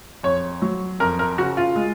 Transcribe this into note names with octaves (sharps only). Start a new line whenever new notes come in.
F2 C#5
F#3
F2 A#4
A#4
C#3 F#4
F4
G#3